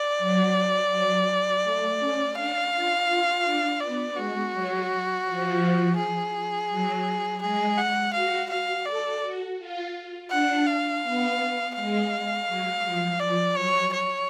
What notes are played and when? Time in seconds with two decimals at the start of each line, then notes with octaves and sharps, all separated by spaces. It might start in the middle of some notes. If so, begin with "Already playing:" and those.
Already playing: D5
0.18 F#3
0.91 F#3
1.63 A3
1.99 C#4
2.35 D4 F5
2.72 F4
3.08 F4
3.44 D4
3.80 B3 D5
4.16 G#3 F#4
4.52 F#3
5.24 F3
5.97 G#4
6.69 F#3
7.41 G#3 G#4
7.78 F#5
8.13 F#4 F5
8.50 F5
8.86 A4 D5
9.22 F#4
9.59 F4
10.30 D4 F#5
10.67 F5
11.03 B3
11.75 G#3 F5
12.48 F#3
12.84 F3
13.20 F3 D5
13.56 F#3 C#5
13.93 C#5